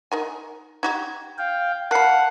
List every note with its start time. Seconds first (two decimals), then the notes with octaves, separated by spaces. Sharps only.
0.12 D#4 A#4 G#5
0.83 D#4 F#4 G4 G#6
1.38 F5 G5
1.91 A#4 F5 F#5 A5 B5 C7 C#7